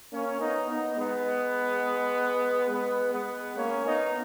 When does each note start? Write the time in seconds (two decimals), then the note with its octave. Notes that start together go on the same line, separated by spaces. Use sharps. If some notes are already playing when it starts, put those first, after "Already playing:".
0.12 A#3 C#4
0.40 B3 D#4
0.69 B3 D#4
0.98 G#3 B3
2.70 G#3 B3
3.13 G#3 B3
3.56 A#3 C#4
3.85 B3 D#4